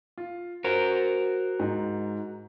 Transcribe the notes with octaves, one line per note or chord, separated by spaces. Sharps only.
F4
F#4 A#4 C5
G#2